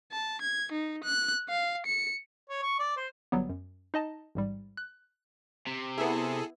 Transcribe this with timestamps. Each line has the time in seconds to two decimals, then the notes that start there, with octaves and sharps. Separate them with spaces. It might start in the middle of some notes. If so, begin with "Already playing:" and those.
0.12 A5
0.41 G#6
0.72 D#4
1.04 F#6
1.49 F5
1.86 C#7
2.49 C#5
2.62 C#6
2.79 D5
2.97 C5
3.32 G1 F#3 G3 B3
3.49 F#2
3.94 D#4 D#5 A5
4.35 A1 G#2 G3
4.77 F#6
5.67 C3
5.98 B3 E4 G#4 A4